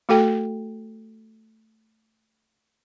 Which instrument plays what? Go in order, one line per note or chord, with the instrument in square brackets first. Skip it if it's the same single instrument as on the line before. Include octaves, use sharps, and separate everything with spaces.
[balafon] A3 F#4 A4 G5